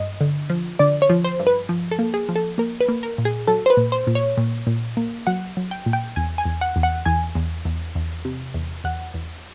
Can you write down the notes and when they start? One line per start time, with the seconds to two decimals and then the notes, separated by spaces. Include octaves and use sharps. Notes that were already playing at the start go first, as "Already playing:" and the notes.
Already playing: G2 D#5
0.21 D3
0.50 F3
0.79 D3 D5
1.02 C#5
1.10 F3
1.24 C5
1.40 G2
1.47 B4
1.69 F3
1.91 A4
1.99 A#3
2.14 G#4
2.29 F3
2.36 A4
2.58 A#3 A#4
2.80 B4
2.88 A#3
3.03 A#4
3.18 A#2
3.25 G#4
3.47 F#3 A4
3.66 C5
3.70 B4
3.77 A#2
3.92 C5
4.07 A#2
4.15 C#5
4.37 A#2
4.67 A#2
4.97 A#3
5.27 F#3 F#5
5.57 F#3
5.71 G5
5.86 A#2
5.93 G5
6.16 E2 G#5
6.38 G#5
6.45 E2
6.61 F#5
6.76 E2
6.83 F#5
7.06 E2 G#5
7.35 E2
7.65 E2
7.95 E2
8.25 C3
8.54 E2
8.84 E2 F#5
9.14 E2